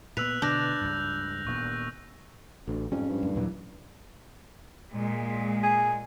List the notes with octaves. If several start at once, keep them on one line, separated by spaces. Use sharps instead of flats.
A#2 B3 B4 E6 F#6 F7
B2 D3 D4 G6 A#6
C#2 G2
D#1 A#2 B3 C#6
A1 D2
F2 G#2 F3 G3 C#4
G2
F#2 A2 D3
D#2 A#2 E3 F#3
A#2 G#3
G#4